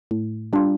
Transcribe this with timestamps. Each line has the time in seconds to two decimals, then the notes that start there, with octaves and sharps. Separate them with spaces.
0.11 A2
0.53 G3 D4 F4